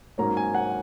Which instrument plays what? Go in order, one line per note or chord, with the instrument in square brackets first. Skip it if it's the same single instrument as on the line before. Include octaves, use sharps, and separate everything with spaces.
[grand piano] G#2 F#3 A#3 C#4 A#5
G#5
F#5